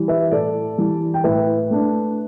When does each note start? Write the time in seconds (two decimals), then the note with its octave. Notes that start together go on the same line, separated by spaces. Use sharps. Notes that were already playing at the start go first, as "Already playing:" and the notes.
Already playing: E3 G3
0.08 B4 E5
0.31 A2 A4 D5
0.78 E3 G3
1.14 G5
1.24 A2 B4 E5
1.70 A3 D4